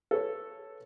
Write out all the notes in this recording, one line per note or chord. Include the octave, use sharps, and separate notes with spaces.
A4 B4 C#5